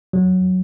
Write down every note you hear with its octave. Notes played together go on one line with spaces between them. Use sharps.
F#3